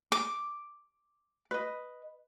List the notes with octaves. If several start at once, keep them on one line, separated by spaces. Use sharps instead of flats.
D6
B4 D#5